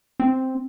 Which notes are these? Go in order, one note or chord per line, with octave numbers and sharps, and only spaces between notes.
C4